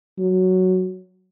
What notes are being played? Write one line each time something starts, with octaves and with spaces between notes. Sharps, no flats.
F#3